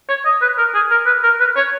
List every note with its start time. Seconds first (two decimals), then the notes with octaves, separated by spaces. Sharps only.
0.09 C#5
0.25 D#5
0.42 B4
0.58 A#4
0.75 G#4
0.91 A#4
1.06 B4
1.23 A#4
1.40 B4
1.56 C#5